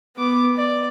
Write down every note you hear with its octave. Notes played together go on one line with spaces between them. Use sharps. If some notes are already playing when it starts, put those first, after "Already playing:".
B3 D6
D5